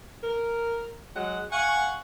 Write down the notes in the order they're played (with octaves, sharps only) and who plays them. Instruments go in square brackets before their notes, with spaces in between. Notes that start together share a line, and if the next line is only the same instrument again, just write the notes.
[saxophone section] A#4
F#3 G#3 F#5
[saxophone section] F5 F#5 [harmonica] G#5 C#6